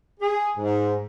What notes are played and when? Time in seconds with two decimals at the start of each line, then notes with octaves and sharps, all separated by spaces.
0.20 G#4
0.58 G#2